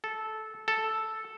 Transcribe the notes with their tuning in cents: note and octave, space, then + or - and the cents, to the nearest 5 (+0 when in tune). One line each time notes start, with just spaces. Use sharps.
A4 -10
A4 +0